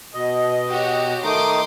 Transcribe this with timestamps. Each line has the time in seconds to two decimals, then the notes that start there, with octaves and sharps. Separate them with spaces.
0.14 B2 D#5
0.69 F#4 G4 C#5
1.24 D#3 A3 D#4 C6 D6 D#6